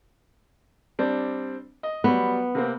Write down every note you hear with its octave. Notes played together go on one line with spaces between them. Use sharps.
G3 C4 D4
D#5
F#3 G3 B3
C3 A#3 C4